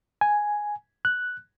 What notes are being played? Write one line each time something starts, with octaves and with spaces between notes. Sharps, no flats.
G#5
F#6